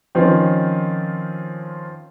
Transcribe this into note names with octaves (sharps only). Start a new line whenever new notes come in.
D#3 F3 C4 C#4